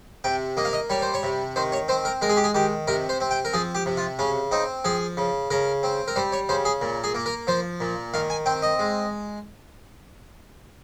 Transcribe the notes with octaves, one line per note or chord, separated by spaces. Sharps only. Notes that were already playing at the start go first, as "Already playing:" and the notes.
C3 G5
A#3 D#5
F5
D#5
G3 C#5
C5
C#5
C3
D#3 C5
C#5
C4 C5
A#4
G#3 A#4
G#4
G4
G#4
D#3 G4
C3 A#4
C5
C4
G5
A#4
F3 G#4
G4
C3
F4
C#3 C#4
C4 D#4
F3 G#4
C#3
C#3 A#4
C4
A#4
G3 C5
C#5
C#3 C5
G#4
A#2
G#4
A#3
A#4
F3 C5
A#2
D#3 F5
G#5
C4 G5
D#5
G#3